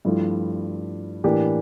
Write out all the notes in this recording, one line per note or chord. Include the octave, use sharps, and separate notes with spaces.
G2 F3 A3 E4
A2 E3 A#3 D4 G4